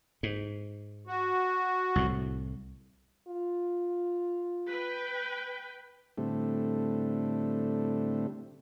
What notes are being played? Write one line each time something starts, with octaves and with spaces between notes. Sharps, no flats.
G#2
F#4
C2 A2
F4
B4 G5
A2 D3 G3 A3 C4